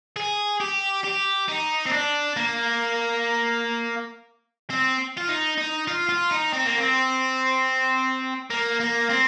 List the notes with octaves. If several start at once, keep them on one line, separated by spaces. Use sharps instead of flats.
G#4
G4
G4
D#4
C4
D4
A#3
C4
F4
D#4
D#4
F4
F4
D#4
C4
A#3
C4
A#3
A#3
C4